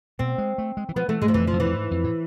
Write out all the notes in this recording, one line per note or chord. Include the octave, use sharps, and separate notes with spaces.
B2 C4
G#3
A3
G#3
E3
F3 B3
E3 A3
G#2 G#3
F3
F2 E3
F3
F2
E3
F2
G#2
F2
A2